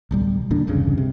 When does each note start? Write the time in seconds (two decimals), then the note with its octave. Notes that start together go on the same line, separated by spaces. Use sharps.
0.11 D1 B1 G3
0.50 D#1 A#2 D3 D4
0.67 E1 C2 G2 C#3
0.98 C3